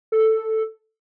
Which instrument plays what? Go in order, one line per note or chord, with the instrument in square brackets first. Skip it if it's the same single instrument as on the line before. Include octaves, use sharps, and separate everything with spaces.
[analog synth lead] A4